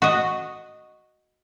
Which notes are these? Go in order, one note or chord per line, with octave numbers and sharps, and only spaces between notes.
F#4 D#5